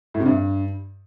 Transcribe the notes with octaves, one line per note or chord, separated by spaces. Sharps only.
A2
C3
G2